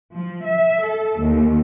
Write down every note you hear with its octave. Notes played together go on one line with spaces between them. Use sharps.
F3
E5
A4
D#2